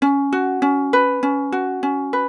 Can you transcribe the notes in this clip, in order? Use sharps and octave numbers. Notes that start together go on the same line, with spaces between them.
C#4
F#4
C#4
B4
C#4
F#4
C#4
B4